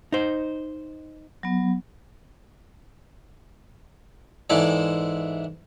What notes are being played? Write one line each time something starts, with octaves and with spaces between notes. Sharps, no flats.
D#4 C5
F#3 B3
G#2 E3 G#3 E4 A4 D5